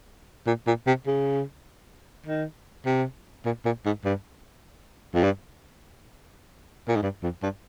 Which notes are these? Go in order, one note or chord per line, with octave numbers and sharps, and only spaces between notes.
A#2
A#2
C3
C#3
D#3
C3
A#2
A#2
G#2
G2
F2
G2
A#2
G#2
G2
F2
G2